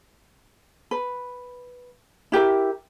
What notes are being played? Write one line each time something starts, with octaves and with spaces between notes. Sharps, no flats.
B4
E4 G4 A#4 E5